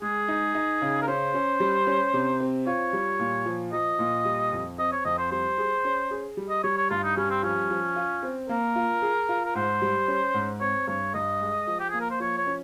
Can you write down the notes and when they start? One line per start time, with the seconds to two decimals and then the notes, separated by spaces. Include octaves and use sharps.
0.02 G#3 G#4
0.28 D#4
0.55 D#4
0.82 C#3
1.02 A#4
1.07 C#4 C5
1.34 C#4
1.60 G3
1.87 C#4
2.14 C3
2.40 C4
2.67 F4 C#5
2.93 G3
3.19 A#2
3.46 F3
3.72 F3 D#5
3.99 A#2
4.25 G3
4.52 F2
4.78 C4 D#5
4.92 C#5
5.05 F2 D#5
5.18 C5
5.31 G3 C5
5.58 G#4
5.85 C#4
6.11 G#4
6.37 G3
6.50 D#5
6.63 G3 C#5
6.77 C#5
6.90 G2 F4
7.04 D#4
7.17 G3 C#4
7.30 C4
7.43 F3 C#4
7.70 F3
7.96 F4
8.23 C4
8.49 A#3 A#4
8.76 F4
9.02 G#4
9.29 F4
9.45 A#4
9.55 G#2 C5
9.82 G3
10.08 C#4
10.34 G#2
10.60 C4 C#5
10.88 G2 C#5
11.14 G2 D#5
11.41 G#3
11.67 F3
11.80 G4
11.90 A#3 G#4
12.00 A#4
12.10 C5
12.20 F3 C#5
12.37 C#5
12.47 C#4